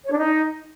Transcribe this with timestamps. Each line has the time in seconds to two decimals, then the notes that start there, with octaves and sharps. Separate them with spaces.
0.04 C#5
0.11 D4
0.18 D#4